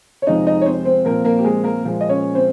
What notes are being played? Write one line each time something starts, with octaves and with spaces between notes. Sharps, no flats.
C#5
F2 C3 F3 G#3 C4 D#4 D#5
D#4 D#5
C#5
C4 C5
C4 C5
A#2 F3 A#3 C4 A#4
A#3 A#4
G4
G#3 G#4
A#3 A#4
A#2 F3 G#3
D#5
C#4 C#5
C4 C5